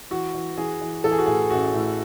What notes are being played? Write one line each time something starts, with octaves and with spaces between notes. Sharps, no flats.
E3 F#4
E3
E3 G#4
E3
E3 A4
G#4
F#4
A2 G#4
A1 F#4
A2